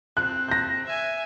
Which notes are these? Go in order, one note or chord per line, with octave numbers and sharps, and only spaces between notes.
C4 F#6
G6 A#6
E5 G#5